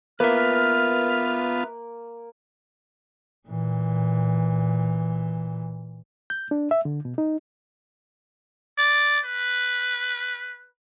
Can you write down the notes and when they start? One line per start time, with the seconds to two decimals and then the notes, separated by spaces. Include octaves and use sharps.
0.20 A#3 B3 F4 B4 E5 F6
3.48 A#2 E3
6.30 G6
6.51 D4
6.71 E5
6.85 D3
7.05 B2
7.18 D#4
8.78 D5
9.25 B4